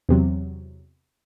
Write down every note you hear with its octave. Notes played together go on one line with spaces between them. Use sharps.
E2 C3 F#3